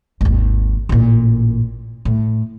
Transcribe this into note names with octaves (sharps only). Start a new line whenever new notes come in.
G#1 D#2
A1 A#2
A2